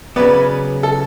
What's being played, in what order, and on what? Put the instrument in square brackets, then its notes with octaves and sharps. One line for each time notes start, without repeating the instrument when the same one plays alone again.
[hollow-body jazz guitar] C#3 F#3 B3 [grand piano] B4 D5
[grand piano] A4